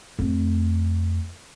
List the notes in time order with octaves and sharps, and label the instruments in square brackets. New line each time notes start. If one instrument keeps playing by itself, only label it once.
[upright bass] F2 A3